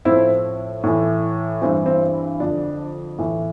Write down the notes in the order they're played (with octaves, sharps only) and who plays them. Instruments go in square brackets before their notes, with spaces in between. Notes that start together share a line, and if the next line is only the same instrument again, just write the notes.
[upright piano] A2 F3 C4 E4
A2 E3
G2 E3 C4
C4
F2 D3 F3 D4
A2 E3